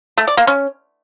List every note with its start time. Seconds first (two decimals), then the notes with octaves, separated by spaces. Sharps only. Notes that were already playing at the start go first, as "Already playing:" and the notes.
0.18 A3
0.27 D5
0.37 A#3
0.47 C#4